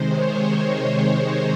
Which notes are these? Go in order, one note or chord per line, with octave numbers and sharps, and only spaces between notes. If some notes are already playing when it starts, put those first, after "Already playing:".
Already playing: C3 D#3 G#3 C5
C#5